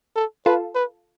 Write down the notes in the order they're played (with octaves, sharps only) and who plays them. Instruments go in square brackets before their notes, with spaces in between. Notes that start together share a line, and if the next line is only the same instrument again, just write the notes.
[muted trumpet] A4
[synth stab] F4 A4 [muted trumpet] B4
[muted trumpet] B4